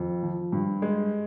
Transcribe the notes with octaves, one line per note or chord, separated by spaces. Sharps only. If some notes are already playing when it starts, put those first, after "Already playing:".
Already playing: F2
F3
G2
G#3